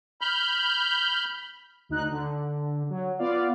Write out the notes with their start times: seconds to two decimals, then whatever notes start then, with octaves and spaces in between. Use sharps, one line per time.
0.21 B5 F6 G6
1.89 D2 D#4 F#6
2.10 D3
2.90 F#3
3.19 B3 F4 D5 F5